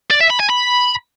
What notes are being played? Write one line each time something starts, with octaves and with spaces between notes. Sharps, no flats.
D5
E5
B5
G#5
B5